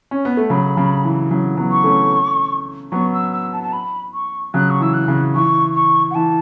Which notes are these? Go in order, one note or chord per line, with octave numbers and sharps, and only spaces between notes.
C#4
B3
A3
C#3 F#3 B5
C#3 F#3
E3
C#3 F#3
F#3 B3
C#6
A3 C#4
F#3 B3 C#6
E6
E6
A5
A5
B5
C#6
C#3 F#3 F#6
C#6
E3 E6
F#6
C#3
E3 C#6
C#6
F#5
E3 A5